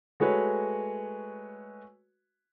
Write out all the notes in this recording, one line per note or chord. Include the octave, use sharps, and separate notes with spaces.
G#3 A3 F#4 B4 C#5